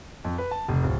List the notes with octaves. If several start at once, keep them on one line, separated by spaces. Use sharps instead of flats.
F2
B4
A5
F1
D1